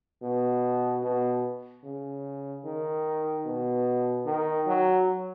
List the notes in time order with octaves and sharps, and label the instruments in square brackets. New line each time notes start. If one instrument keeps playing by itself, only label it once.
[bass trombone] B2
B2
C#3
D#3
B2
D#3
F#3